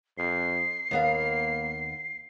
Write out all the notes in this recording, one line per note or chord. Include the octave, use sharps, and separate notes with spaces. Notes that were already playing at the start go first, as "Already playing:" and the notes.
F2 C7
D#2 A#3 B3 F5